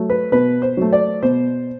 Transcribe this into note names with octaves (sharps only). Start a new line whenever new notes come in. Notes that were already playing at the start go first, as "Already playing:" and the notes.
Already playing: F#3 A3
B4
B2 B4
C5
F#3 A3
D5
B2 C5